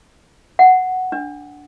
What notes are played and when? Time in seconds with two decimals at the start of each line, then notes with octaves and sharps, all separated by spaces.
0.59 F#5
1.12 D4